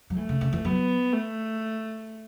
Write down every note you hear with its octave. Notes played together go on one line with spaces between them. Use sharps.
F#3
E3 A3
C#3
C#3
E3
F#3 B3
A3